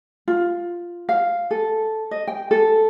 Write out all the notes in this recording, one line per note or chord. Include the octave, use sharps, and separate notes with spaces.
F4
F5
A4
D#5
G5
A4